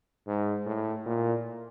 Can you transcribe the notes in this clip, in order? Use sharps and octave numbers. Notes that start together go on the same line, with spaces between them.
G#2
A2
A#2